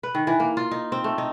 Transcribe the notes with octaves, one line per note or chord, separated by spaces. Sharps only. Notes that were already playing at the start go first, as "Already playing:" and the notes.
B4
D#3
E3
A#3
F4
D#4
C4
A3
D#4